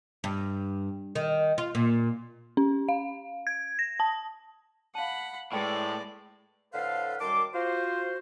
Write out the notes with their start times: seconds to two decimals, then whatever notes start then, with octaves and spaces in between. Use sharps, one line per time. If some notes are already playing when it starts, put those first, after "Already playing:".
0.24 G2
1.15 D#3
1.58 F4
1.75 A#2
2.57 C#4
2.89 F5
3.47 G#6
3.79 A#6
4.00 A5
4.95 F5 F#5 A5 B5
5.53 A2 G#3 B4 D5 G5
6.74 A2 D3 A4 B4 C5 F5
7.20 F#2 D#3 G3 A5 C6 D6
7.54 F4 F#4 C5